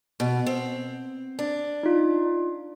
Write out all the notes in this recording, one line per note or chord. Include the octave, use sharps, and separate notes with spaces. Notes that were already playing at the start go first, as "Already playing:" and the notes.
B2
C4
D4
D#4 F4